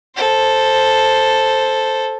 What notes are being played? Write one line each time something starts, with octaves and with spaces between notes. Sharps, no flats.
A4 C5